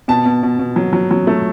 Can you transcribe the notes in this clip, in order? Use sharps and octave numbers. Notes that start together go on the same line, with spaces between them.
B2 A5
B2
B2
B2
F#3
F#3
F#3
A3